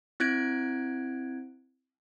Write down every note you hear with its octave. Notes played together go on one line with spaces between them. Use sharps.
C4 E4 F#6 G#6 D7